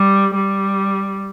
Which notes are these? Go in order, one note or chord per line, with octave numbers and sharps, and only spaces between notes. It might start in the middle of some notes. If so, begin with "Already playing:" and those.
Already playing: G3
G3